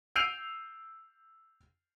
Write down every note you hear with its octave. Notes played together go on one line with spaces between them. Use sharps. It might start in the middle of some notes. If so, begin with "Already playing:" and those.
E6 G6 C7 D7 D#7 F7